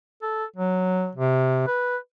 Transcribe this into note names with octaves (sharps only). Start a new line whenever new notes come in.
A4
F#3
C3
B4